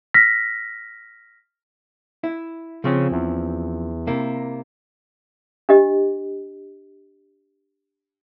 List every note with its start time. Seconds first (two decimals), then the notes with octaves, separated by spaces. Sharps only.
0.14 F6 A#6 B6
2.24 E4
2.84 C#3 F3 C4 C#4
3.11 E2
4.07 C3 A#3 E4
5.69 D4 G4 D#5